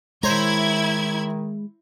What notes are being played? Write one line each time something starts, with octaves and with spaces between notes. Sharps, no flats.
D#3 G#3 E4 C5 C#5 A#5 G#6